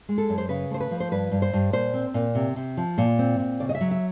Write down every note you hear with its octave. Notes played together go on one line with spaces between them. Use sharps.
G#3
A4
F#2
C5
C#3 B4
A3 C5
B4
F3
C5
G2 B4
G2
C5
G2
A#2 C5
C4
A#2
C3
C3
F3
A#2
C4
A#2
C#3 D5
D#5
E5
F#3
E5